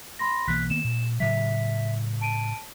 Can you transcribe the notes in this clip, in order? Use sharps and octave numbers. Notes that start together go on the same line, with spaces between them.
B5 C6 A#6
B1 E3 A#3 F#6 B6
D#3 A#3 B3 E7
A#2
A2 C#3 F#3 E5 B6
A5 D7 D#7